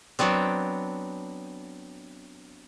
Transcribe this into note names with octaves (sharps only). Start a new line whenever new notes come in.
F#3 B3 C4 D4